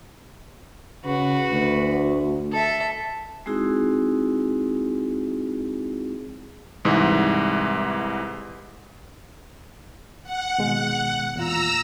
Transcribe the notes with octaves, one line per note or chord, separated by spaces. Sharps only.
C#3 F#4 B4
D2
A4 E5
G#3 C4 D#4 E4 F#4 G#4
C2 G#2 E3
F#5
B2 D#3 G#3
E2 A#2 F4 A#5 E6